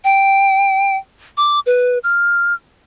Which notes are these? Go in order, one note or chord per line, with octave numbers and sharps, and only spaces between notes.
G5
D6
B4
F6